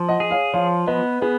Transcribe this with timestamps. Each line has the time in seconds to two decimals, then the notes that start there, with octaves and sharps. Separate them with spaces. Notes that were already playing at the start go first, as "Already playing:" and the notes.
Already playing: F3
0.08 D#5 F#5
0.20 G#4
0.31 C#5 F5
0.54 F3 C#5 F5
0.87 B3 B4 D#5
1.21 B3 G#4 B4